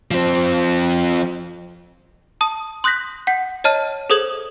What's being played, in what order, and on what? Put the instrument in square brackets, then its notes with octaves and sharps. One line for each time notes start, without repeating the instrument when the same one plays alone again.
[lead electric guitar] F3 C4
[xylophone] A5 D#6
C6 D#6 F#6 G6 A#6 B6
F#5 G6 B6
C#5 D#5 A5 F6 D#7
G#4 A4 C5 D#6 G#6 F#7